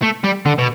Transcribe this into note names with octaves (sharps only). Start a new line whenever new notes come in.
A3
G3
D3
B2